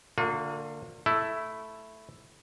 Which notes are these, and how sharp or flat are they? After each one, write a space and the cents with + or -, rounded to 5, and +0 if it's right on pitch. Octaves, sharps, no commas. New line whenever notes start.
D3 +0 A#3 -30 F4 +40
A3 +0 E4 +0